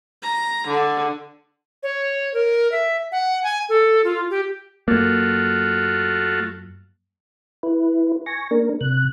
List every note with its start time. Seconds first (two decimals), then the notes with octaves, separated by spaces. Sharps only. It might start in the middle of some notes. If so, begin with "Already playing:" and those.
0.22 A#5
0.67 D3
1.83 C#5
2.34 A#4
2.72 E5
3.12 F#5
3.44 G#5
3.69 A4
4.04 F4
4.30 G4
4.88 F#2 A3 A#3 F4 F#4
7.63 E4 B4
8.26 G#5 C#6 A#6
8.51 A#3 D4 A#4
8.81 C3 F#6